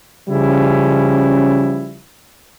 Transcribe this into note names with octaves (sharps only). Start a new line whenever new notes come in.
C#3 F3 G3 C#4 E4